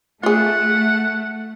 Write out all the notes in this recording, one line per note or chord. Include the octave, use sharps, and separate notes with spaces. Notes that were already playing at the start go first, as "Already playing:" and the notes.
A3 F4 G#4 F#5